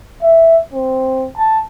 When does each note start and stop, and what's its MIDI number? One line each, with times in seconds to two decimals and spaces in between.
0.23 0.58 76
0.73 1.28 60
1.37 1.59 81